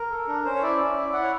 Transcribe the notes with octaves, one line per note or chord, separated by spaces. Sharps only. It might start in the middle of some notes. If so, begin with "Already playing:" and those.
Already playing: A#4
A4
D4
C#4 C5
C#5
E4 D5
C#4
E4
E4 F#5
C#5